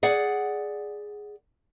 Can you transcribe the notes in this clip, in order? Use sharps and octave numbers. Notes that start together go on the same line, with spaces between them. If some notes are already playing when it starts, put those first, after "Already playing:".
G#4 D5 F#5